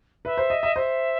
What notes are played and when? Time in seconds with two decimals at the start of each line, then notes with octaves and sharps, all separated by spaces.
0.25 B4 E5
0.38 C5
0.50 D#5
0.63 D#5
0.76 C5 E5